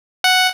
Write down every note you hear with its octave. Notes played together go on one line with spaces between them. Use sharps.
F#5